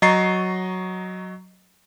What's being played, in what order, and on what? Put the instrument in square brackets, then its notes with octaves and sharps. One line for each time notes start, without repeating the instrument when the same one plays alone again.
[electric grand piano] F#3 D#5 A#5 C#6 A6 C7